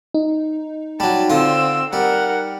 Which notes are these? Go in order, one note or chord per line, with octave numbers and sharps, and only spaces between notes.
D#4
F#3 G3 A5
D3 C4 F4 E6
G3 A#4 F#5